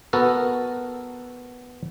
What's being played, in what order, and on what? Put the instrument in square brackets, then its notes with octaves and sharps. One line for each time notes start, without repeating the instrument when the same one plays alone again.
[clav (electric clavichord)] B3 F#4 A4 A#4